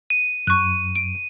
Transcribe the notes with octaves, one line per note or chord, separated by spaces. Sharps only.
D#7
F#2 C#6 F#6
D7